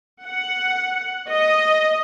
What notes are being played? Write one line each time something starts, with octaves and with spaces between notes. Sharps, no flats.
F#5
D#5